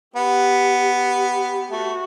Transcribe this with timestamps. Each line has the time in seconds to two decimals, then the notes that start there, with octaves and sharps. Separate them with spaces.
0.16 B3 G4
0.94 G4
1.72 A3 F#4